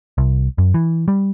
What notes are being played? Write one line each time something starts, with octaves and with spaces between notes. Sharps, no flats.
C2
F#2
E3
G3